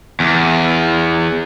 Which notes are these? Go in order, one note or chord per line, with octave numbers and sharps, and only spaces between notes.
E2